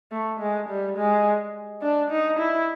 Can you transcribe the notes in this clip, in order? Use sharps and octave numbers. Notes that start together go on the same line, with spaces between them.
A3
G#3
G3
G#3
D4
D#4
E4